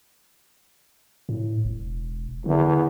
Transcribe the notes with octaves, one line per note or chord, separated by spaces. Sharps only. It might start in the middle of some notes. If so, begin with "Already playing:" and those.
A2
E1
E2 D3